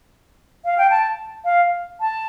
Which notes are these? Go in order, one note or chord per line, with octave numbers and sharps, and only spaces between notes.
F5
G5
A5
F5
A5